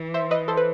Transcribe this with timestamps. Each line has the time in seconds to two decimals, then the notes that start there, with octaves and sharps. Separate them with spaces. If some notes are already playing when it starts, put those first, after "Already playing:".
Already playing: E3
0.14 C5 E5
0.31 B4 D#5
0.48 A4 C5
0.57 B4